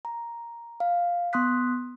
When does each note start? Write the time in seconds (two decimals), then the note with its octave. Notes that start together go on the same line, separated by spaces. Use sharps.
0.05 A#5
0.80 F5
1.33 B3 C6 D#6 F#6 B6